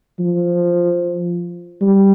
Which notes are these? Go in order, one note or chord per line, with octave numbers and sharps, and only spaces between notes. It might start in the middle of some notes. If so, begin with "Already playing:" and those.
F3
G3